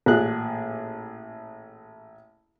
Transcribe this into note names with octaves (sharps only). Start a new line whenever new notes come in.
A1 A#2 G#4 F#6